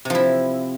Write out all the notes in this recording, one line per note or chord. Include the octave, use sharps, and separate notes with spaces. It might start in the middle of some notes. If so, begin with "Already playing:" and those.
C3 F3 E4